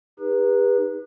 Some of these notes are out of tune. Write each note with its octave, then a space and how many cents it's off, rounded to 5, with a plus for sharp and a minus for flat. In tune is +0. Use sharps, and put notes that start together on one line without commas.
D#4 +0 G4 +45 B4 -20